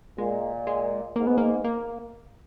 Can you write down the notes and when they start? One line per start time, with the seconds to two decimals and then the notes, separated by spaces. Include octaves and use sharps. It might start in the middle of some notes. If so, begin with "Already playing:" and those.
0.18 A#2 G#3
0.67 G#3
1.16 G#2 A#3
1.27 B3
1.38 A#3
1.64 A#3